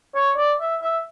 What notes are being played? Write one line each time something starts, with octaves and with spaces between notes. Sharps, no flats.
C#5
D5
E5
E5